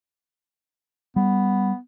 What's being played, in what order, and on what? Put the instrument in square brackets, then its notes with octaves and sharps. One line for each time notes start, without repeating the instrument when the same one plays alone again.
[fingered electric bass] G3 [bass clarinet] B3